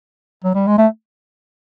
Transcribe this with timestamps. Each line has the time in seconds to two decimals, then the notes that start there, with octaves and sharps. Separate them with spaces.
0.44 F#3
0.55 G3
0.67 G#3
0.78 A3